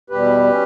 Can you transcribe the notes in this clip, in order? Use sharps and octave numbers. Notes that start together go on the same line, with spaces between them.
E2 B2 G3 G4 B4
C#4